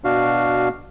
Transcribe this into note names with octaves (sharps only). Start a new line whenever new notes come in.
B2 D4 F#4 F5